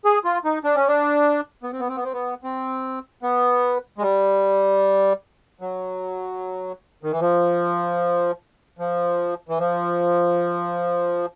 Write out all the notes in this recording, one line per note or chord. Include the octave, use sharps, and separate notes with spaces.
G#4
F4
D#4
D4
C#4
D4
B3
C4
B3
C4
B3
C4
B3
C4
B3
G#3
G3
F#3
D#3
E3
F3
F3
E3
F3